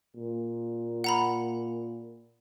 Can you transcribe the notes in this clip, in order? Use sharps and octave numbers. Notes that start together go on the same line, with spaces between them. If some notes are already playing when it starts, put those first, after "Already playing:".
A#2
F#5 A#5 B5